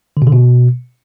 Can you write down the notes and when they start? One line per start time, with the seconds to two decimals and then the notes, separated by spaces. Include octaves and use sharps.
0.17 D3
0.22 B2
0.27 D3
0.32 B2